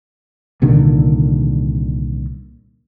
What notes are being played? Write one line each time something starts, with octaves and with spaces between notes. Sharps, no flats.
C2 A#2 D3 D#3